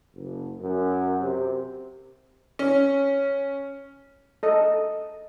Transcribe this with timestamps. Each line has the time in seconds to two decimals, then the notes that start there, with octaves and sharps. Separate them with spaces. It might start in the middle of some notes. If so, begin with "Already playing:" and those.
0.14 F#1
0.61 F#2
1.20 C3
2.59 C#4
4.43 A4 D#5